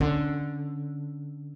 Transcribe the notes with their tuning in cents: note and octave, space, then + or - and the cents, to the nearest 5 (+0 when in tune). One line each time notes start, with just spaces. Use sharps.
D3 +0 C#4 +0